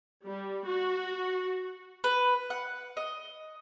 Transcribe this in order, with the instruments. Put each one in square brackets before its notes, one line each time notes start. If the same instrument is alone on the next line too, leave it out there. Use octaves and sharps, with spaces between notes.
[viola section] G3
F#4
[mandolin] B4
F#5
D#5